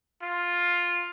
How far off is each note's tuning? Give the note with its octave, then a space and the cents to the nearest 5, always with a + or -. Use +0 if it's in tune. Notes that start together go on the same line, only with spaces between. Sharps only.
F4 +5